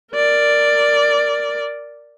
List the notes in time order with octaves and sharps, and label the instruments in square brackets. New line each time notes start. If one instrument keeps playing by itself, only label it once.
[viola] A#4 D5